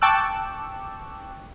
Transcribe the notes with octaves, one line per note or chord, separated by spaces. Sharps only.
G5 A5 C#6 D6 E6 F#6